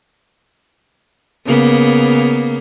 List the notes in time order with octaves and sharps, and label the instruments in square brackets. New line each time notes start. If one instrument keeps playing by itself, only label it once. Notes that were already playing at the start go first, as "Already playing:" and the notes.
[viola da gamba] C#3 A#3 B3